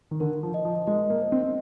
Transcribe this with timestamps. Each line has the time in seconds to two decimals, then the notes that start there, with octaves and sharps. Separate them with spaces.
0.11 D#3
0.20 D3 A#4
0.43 F3
0.54 D#5
0.65 F3
0.87 G#3 D#5
1.10 A#3
1.21 C5
1.32 C4